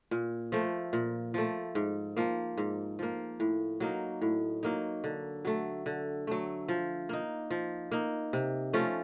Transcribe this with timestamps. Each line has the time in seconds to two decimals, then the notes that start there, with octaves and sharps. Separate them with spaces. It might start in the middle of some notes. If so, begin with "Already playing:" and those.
0.11 A#2
0.52 F3 A3
0.93 A#2
1.34 F3 A3
1.75 G#2
2.16 F3 A#3
2.57 G#2
2.99 F3 A#3
3.40 A2
3.80 F#3 A#3 D#4
4.21 A2
4.63 F#3 A#3 D#4
5.04 D3
5.45 F#3 A3
5.86 D3
6.27 F#3 A3
6.68 F3
7.09 A#3 D#4
7.50 F3
7.91 A#3 D#4
8.33 C3
8.73 F3 A3 C#4